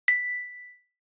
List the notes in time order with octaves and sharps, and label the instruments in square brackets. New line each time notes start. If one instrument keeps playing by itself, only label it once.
[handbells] B6